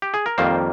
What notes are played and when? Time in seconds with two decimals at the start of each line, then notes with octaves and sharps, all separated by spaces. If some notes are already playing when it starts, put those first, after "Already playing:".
0.02 G4
0.14 G#4
0.26 A#4
0.38 F2 D#3 G3 A#3 C5